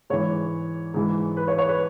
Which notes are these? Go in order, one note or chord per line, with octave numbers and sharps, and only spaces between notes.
G#2 E3 C#5
G#2 E3
B4
C#5
C#5
B4